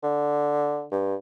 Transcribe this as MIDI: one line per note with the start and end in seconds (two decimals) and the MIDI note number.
0.03 0.85 50
0.91 1.15 43